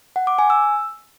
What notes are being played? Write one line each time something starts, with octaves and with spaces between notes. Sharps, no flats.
F#5
D6
G#5
E6